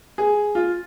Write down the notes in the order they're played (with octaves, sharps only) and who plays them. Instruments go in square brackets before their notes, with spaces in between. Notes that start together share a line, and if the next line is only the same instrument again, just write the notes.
[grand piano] G#4
F4